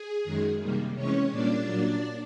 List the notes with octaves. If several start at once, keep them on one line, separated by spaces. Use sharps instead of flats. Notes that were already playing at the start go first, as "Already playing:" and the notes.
Already playing: G#4
F#2 D#3 G#3
C3 D#3 G3 A#3
C3 E3 G#3 C#4 C#5
A#2 G3 A#3 D4 D5
A#2 F#3 A#3